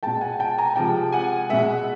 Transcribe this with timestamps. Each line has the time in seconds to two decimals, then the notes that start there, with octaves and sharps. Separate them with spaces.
0.03 B2 G#3 G5 A5
0.21 F#5 G#5
0.40 G5 A5
0.58 G#5 A#5
0.76 C3 F3 G#3 G5 A5
1.12 F#5 G#5
1.50 B2 G#3 E5 F#5